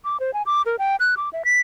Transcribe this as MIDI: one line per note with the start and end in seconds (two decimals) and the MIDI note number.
0.05 0.17 86
0.20 0.33 72
0.34 0.42 80
0.46 0.62 86
0.66 0.76 70
0.79 0.96 79
1.00 1.15 90
1.17 1.29 86
1.33 1.42 76
1.45 1.61 95